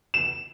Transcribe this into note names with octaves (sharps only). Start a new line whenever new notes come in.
E7